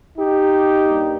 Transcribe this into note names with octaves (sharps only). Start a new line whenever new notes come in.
D#4 G4
G2 G3 A#3